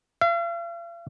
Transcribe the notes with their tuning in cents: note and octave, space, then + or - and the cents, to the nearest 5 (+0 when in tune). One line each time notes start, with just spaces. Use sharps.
F5 -45